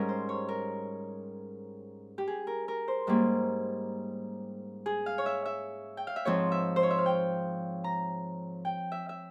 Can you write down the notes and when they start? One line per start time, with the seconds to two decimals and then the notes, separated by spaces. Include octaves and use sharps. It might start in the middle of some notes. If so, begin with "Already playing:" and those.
Already playing: G#2 G3 C#4 A#4
0.09 C5
0.29 C#5
0.49 A#4
2.18 G4
2.28 G#4
2.47 A#4
2.68 A#4
2.88 C5
3.07 G#2 G3 A#3 C#4
4.86 G#4
5.06 F5
5.18 C#5
5.26 E5
5.45 E5
5.97 G5
6.07 F5
6.16 E5
6.25 G#2 F3 C4 C#5
6.52 E5
6.76 C5
6.83 C#5
6.91 E5
6.98 F5
7.06 G5
7.84 A#5
8.65 G5
8.92 E5
9.09 E5